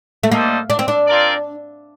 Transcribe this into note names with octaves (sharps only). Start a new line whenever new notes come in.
A3
G3 A#3 D4 A4 C5 D#5
D4
C4
D4
C4 F4 A#4 D5